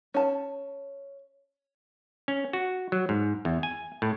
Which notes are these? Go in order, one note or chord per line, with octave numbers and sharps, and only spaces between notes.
C#4 A5
C#4
F#4
F#3
G#2
E2
G#5
A2